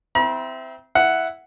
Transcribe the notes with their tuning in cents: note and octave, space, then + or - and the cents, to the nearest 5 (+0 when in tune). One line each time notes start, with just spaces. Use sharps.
C4 -20 E4 +5 A#5 +45
E4 +0 F#5 +0